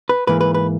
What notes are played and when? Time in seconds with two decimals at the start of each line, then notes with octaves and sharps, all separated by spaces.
0.09 B4
0.27 G#2 E3 A#3 B4
0.41 B4
0.54 B4